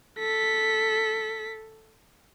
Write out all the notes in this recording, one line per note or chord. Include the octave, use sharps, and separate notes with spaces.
A4 B6